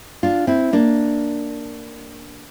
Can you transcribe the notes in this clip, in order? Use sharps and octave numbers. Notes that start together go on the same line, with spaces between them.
D4 F4
C4 E4
A#3 D4